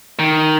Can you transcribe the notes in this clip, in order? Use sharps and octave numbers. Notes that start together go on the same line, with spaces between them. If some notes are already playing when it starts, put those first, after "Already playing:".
D#3